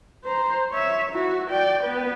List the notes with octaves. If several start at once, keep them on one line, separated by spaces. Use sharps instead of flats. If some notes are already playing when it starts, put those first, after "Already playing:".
C5 A#5
C#5 E5
E4 F#4
D5 G5
B3 B4